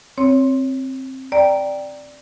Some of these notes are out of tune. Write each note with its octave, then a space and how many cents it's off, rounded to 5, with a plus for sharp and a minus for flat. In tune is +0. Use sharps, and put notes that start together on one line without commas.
C4 +15 C#5 +10
D5 +0 G5 +0 A#5 +0